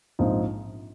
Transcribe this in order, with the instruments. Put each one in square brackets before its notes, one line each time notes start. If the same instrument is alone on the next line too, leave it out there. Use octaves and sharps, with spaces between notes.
[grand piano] A#1 G#2 F3 C4 D#4